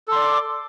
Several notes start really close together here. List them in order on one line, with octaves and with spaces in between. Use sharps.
A4 C6 D5 D6